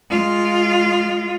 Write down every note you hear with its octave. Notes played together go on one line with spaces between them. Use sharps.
G#3 F4